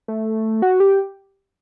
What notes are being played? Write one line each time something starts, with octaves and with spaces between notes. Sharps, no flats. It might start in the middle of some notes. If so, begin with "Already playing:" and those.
A3
F#4
G4